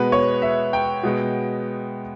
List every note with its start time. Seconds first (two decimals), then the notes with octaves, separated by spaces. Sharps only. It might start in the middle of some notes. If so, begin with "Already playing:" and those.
Already playing: B2 G#3 B3 B4
0.12 C#5
0.42 E5
0.73 G5
1.03 B2 G#3 B3